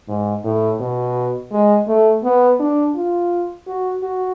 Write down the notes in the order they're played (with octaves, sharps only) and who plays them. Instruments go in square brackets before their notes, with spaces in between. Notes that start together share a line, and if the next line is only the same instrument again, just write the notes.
[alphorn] G#2
A2
B2
G#3
A3
B3
D4
F4
F#4
F#4